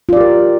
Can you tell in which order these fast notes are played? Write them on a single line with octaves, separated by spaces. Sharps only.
F4 D5 G4 A#4